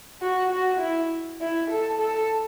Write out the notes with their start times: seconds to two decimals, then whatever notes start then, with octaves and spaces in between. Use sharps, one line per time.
0.22 F#4
0.51 F#4
0.81 E4
1.41 E4
1.70 A4
2.00 A4